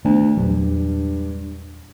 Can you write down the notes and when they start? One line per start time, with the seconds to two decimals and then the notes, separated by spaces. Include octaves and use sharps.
0.05 D2 D#3 B3
0.37 E2 G2 A#2 F#3